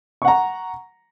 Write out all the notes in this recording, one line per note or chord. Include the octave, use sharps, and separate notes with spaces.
F#5 A#5 C#6